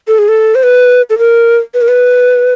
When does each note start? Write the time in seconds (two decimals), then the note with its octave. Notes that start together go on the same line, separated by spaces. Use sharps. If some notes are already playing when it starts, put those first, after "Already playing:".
0.08 A4
0.19 G#4
0.28 A4
0.55 C5
0.63 B4
1.10 A4
1.18 A#4
1.74 B4
1.81 A#4
1.88 B4